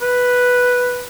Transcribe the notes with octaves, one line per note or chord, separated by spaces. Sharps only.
B4